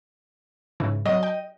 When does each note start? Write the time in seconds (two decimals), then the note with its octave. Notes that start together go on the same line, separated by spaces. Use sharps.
0.80 G#2 C#3 E3
1.06 F#3 D#5
1.23 G5